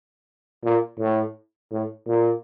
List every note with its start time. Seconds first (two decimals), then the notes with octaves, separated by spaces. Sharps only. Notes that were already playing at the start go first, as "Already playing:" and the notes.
0.65 A#2
1.00 A2
1.72 A2
2.08 A#2